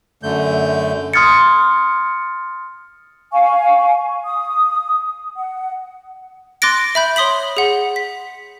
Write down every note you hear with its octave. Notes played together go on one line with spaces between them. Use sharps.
F#2 D3 A3 G6
C6 D#6 F6 G#6 A6 C#7
F5 G#5 C#6
D#6
F#5
C6 D6 F#6 A6 A#6 D7
E5 B5 G6
C#5 C6 D#6 B6 F#7
G#4 F#5
B6